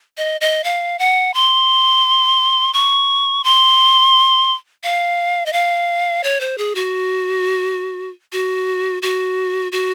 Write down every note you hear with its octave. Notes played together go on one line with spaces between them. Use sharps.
D#5
D#5
F5
F#5
C6
C#6
C6
F5
D#5
F5
C#5
C5
G#4
F#4
F#4
F#4
F#4